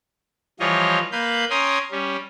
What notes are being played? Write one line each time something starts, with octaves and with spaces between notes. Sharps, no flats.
E3 F3 G3 F4 C#5 D#5
A#3 B4 F5 B5 G6
C#4 G5 G#5 A#5 C6 D#6
G3 C#4